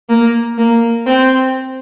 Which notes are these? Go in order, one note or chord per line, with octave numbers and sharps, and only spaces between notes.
A#3
A#3
C4